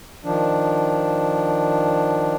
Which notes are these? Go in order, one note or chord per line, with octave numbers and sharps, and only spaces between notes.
D#3 F3 D4